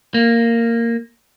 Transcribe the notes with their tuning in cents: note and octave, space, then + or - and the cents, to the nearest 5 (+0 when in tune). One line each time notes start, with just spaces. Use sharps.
A#3 -10